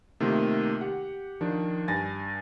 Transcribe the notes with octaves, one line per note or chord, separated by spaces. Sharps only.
C3 D#3 A3 A#3 F4
G4 F#5
D#3 F3 D4
G2 G#5 A6 A#6